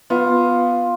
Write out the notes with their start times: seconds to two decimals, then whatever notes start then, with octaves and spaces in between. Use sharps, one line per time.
0.10 B3 F4